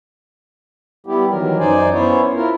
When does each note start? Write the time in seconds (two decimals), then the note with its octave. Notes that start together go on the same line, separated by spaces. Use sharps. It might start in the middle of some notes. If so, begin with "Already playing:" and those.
1.07 G3 B3 E4 G4
1.30 D#3 E3 F#3 A#4
1.59 F#2 D#4 C5 D5 G#5
1.92 B3 C#4 E4 C5 C#5
2.35 E4 F4 A#4